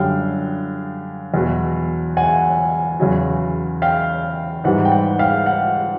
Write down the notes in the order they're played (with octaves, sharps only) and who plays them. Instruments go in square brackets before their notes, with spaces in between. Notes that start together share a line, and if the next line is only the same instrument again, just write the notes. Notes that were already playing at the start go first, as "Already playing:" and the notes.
Already playing: [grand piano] F#2 D3 G3 F5 G5
E2 B2 F#3
F#5 G#5
E2 C#3 F#3
F5 G5
G#2 E3 G3 F#5
G5
F#5
F5 G5
F#5